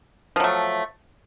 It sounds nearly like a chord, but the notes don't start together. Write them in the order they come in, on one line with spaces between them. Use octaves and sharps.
F3 F#3 A3